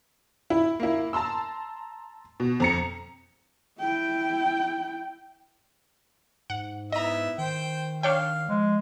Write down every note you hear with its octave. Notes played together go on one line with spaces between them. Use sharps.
E4
A#3 E4
A5 A#5 C6 E6
B2
F2 A#5 C#7
E4 G5
G#2 F#5
B3 E4 D#5 E5 A#5
D#3 C5 G5
D4 C#5 F5 G5
F3 G#3